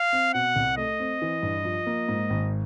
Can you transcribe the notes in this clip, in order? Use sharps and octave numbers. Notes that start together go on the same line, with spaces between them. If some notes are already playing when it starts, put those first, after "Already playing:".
Already playing: F5
C4
B2 F#5
C2
A3 D#5
C4
E3
G2
F3
A#3
G#2
G#1